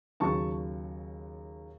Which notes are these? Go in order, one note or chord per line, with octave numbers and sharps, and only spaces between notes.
D#2 C#3 F#3 A5 C#6